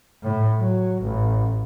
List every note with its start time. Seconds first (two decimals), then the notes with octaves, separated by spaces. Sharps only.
0.22 A2
0.59 F#3
1.02 A1